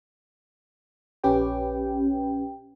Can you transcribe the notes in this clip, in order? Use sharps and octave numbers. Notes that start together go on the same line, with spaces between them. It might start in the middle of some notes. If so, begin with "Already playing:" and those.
A#1 C#4 G4 B4 G5